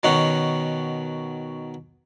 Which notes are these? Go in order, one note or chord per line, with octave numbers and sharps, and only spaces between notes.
B2 D#3 C#4 F#5